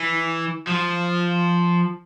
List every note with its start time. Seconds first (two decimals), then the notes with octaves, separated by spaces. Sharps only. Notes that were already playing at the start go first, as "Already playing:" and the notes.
Already playing: E3
0.67 F3